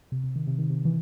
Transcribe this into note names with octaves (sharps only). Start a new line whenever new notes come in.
C3
C3
D#3
C3
D#3
C3
E3